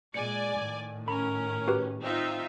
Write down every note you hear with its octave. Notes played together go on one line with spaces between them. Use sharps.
A#2 G#3 D5 G#5 C#7
A2 D#3
C#4 A#4 B5
F#4 G4 B4
C4 D#4 F4 E5